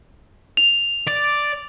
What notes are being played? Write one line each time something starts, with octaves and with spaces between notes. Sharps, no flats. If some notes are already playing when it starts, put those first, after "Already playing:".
F7
D5